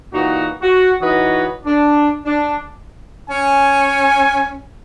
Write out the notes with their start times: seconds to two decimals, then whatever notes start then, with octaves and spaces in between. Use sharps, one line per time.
0.13 A#2 E3 D#4 F#4
0.61 F#4
1.01 E3 D#4 F#4 B4 C#5 D#5
1.65 D4
2.25 D4
3.30 C#4 G#5